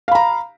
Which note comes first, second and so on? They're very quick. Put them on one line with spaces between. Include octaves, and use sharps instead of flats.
F5 B5 A#5